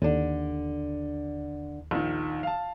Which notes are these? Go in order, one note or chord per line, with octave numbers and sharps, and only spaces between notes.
D#2 D3 D4
A#1 D#3
F5 A5